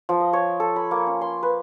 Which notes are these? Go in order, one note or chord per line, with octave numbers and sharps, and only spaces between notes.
F3
D#5
C#5
A4
B5
A#3
C#4
C6
B4